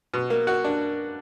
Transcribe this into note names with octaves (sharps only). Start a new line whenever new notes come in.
B2
A#3
F#4
D4